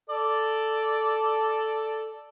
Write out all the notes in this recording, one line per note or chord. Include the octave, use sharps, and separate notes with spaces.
A4 D5